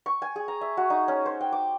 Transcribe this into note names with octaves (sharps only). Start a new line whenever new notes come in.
C#6
G#5
G#4
A#5
E5
F#4
D#4
C#4
C5
G5
D6